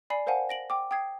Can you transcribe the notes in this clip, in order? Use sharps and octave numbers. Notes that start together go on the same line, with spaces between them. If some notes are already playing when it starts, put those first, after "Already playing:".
D5 G#5 B5 C7
A#4 C5 F5 F#5 G#5 A5
A#6 D7 F#7
G5 D6
G5 D#6 G#6 C7